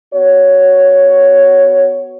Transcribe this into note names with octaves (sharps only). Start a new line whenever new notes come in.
B3 F#4 C#5